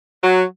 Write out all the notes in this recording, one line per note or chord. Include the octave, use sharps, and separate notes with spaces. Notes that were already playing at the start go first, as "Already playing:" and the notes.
F#3